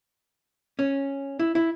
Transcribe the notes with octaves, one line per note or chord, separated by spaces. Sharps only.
C#4
E4
E4